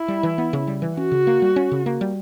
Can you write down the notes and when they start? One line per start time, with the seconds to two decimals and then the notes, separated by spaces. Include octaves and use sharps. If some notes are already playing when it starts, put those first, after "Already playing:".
Already playing: E4
0.08 G3
0.23 E3
0.38 B3
0.53 C#3
0.67 G3
0.82 E3
0.97 C#4 F#4
1.12 C#3
1.27 A#3
1.42 G3
1.56 C#4
1.71 C#3
1.86 A#3
2.01 G3